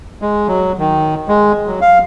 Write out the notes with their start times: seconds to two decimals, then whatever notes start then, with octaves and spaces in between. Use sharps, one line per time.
0.22 G#3
0.48 F#3
0.79 D#3
1.28 G#3
1.67 F#3
1.81 F5